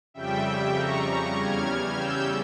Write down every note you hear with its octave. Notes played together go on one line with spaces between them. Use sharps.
F2 C#3 G3 E5 G5
A#5 C#6
E2 C#3 G3 F6 G#6
E6 G6